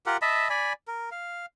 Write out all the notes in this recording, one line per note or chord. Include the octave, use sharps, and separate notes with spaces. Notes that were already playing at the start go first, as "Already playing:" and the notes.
F4 G4 A#4 F#5
D#5 E5 A5 B5
D5 G#5 B5
A#4
F5